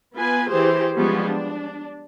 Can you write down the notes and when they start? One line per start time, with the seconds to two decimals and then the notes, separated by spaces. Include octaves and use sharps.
0.15 B3 F4 B4 G#5
0.51 E3 G4 G#4 C5
0.96 F3 G3 G#3 B3 C#4 F4
1.29 D4